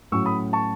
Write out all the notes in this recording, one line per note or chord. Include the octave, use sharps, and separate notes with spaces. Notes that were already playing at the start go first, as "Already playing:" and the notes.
A2 F#3 C#4 C#6 E6
B5 D#6
A5 C#6